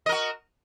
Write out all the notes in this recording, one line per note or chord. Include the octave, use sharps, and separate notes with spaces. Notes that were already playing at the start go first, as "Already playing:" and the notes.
F#4 A#4 D#5